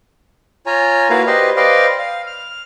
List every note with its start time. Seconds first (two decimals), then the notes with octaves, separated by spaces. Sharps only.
0.66 F4 C#5 G#5 A#5
1.10 A#3 E4 F#4 A#4 B4 F5
1.27 G4 B4 C5 D5 D#5
1.56 B4 C5 D5 D#5 F5 G5
1.99 F5
2.27 F6